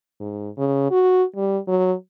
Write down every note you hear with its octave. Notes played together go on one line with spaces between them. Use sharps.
G#2
C#3
F#4
G3
F#3